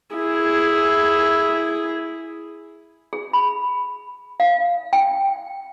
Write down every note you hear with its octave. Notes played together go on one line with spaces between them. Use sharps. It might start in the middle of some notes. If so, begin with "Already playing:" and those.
E4 G#4
G#4
B5
F5
G5